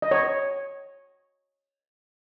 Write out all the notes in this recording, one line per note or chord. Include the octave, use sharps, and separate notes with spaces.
D#5
C#5